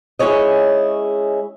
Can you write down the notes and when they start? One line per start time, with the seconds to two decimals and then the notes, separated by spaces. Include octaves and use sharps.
0.19 G#3 C#4 E4 G#4 C#5 D#5